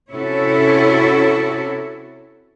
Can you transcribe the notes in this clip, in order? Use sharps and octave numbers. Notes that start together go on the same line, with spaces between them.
C3 C#4 E4 F#4 A4 C#5